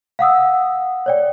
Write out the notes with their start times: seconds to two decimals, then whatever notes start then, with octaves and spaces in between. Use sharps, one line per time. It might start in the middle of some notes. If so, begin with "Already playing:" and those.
0.19 F5 F#5 D#6 E6
1.06 C#5 D5 G5